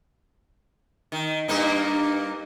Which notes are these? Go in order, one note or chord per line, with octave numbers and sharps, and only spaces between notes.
D#3
G2 A#3 D#4